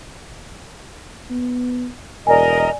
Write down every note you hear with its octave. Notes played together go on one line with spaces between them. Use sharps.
B3
E1 A#4 D5 D#5 G#5